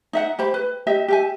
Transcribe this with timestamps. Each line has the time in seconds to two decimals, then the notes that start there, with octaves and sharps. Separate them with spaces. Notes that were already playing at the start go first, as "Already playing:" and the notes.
0.13 D#4 E5 F#5
0.39 G4 C5 B5
0.54 B4
0.87 G4 D#5 E5
1.08 G4 E5 G#5